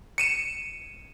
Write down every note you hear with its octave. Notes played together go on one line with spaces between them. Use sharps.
C#7 D#7 E7